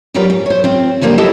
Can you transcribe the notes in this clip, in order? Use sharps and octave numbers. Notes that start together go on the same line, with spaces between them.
D#3 F#3 G3 F4 A#4 B4
G#2
C5 C#5
C4 F4
D3 F3 G3 A#3 C5
E4 G4 A4 C#5 D#5 F5